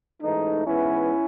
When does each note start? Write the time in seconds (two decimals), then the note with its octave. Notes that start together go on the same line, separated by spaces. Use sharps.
0.22 A1 G#2 E3 A3 D#4
0.67 G#2 E3 B3 C#4 E4